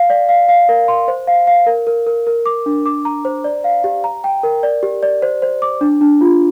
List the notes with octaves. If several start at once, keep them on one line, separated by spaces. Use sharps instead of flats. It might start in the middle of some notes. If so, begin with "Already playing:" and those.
Already playing: F5
D5
F5
F5
A#4
C6
C5
F5
F5
A#4
A#4
A#4
A#4
D6
D4
D6
A#5
C5
D5
F5
G4
A#5
G5
A#4
D5
G4
D5
C5
C5
D6
D4
D4
F4